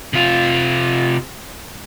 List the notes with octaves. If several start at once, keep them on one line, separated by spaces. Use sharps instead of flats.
C3 F4